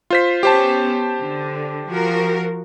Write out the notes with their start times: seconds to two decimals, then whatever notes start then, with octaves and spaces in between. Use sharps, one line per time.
0.10 F4 C5 B6
0.43 B3 C#4 G4 C5 A5
1.17 D3
1.88 F3 F#4 A#4